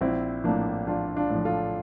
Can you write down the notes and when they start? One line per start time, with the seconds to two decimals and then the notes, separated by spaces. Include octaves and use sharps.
0.01 A#1 C4 E4
0.44 A2 F3 A#3 D4
0.87 A#1 D4 F4
1.16 D4 F4
1.30 A2 F3
1.45 F4 A4